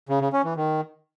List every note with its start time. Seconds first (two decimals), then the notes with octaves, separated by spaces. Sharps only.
0.09 C#3
0.21 C#3
0.33 C#4
0.45 E3
0.56 D#3